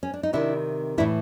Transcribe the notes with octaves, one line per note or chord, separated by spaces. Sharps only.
C#4
D4
D#4
C3 D#3 D4 E4
A2 E3 D4 E4